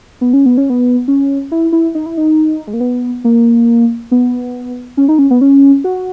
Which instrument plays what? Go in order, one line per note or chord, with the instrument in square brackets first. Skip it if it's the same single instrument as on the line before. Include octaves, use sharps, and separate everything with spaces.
[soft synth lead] B3
C#4
B3
C#4
B3
C#4
E4
E4
D#4
E4
D#4
G#3
A#3
B3
A#3
B3
C#4
D#4
C#4
B3
C#4
F#4